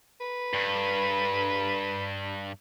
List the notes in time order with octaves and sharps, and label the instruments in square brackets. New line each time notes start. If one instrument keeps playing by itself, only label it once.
[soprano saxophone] B4
[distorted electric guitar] G2